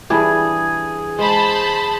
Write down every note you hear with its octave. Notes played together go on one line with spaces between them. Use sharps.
E3 G3 D4 G#4
G#3 C5 A5 B5